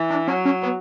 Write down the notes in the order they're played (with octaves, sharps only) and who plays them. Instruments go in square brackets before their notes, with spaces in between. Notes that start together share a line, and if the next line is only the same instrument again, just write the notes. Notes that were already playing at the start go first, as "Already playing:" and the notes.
Already playing: [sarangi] E3
[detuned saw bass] D4
[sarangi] F#3 [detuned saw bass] C#4
[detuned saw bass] C#4
B3